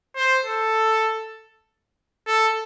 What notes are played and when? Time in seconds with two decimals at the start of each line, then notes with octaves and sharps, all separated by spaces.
0.16 C5
0.45 A4
2.27 A4